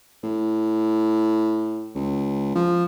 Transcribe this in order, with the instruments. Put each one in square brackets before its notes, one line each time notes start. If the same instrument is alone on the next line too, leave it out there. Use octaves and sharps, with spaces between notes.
[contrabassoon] A2
C#2
F3